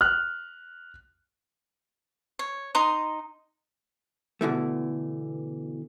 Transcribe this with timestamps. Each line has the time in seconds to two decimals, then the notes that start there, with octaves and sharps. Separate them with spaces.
0.01 F6 F#6
2.39 C#5
2.75 D#4 A#5 C6 D#6
4.41 B2 D3 E3 A3